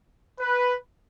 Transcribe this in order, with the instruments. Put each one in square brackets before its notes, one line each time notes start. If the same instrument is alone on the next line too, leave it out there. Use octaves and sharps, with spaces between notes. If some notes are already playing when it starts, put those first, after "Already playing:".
[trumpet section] B4